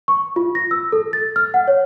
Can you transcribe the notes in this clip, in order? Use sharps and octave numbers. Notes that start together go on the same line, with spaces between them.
C#6
F4
A#6
E6
A4
A6
F6
F#5
C#5